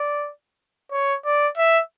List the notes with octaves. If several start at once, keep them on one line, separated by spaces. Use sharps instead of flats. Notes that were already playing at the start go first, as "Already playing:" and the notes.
Already playing: D5
C#5
D5
E5